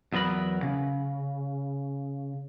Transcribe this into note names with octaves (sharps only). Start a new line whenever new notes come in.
E2 F#3 B3 A#4 B5
C#3